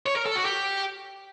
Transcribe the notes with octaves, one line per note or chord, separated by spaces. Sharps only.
C#5
A#4
A4
F#4
G4